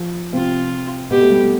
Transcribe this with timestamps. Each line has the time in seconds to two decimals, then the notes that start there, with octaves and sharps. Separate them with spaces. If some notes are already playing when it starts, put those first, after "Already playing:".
Already playing: F3
0.33 C3 C4 F4
1.11 B2 B3 G4
1.21 A3
1.30 G3
1.39 A3